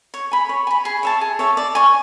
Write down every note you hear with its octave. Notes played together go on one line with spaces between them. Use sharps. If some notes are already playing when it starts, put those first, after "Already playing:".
C#5
G#5 B5
C#5
G#5 B5
G#4
C#5 E5 A5
G#4
C#5 E5 A5
D5
G#5 C#6